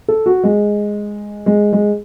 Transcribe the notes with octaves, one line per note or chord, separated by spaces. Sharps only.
A4
F#4
G#3
G#3
G#3